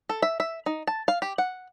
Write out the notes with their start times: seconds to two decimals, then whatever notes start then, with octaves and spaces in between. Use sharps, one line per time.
0.09 A4
0.22 E5
0.40 E5
0.66 D#4
0.87 A5
1.08 F5
1.22 G4
1.38 F#5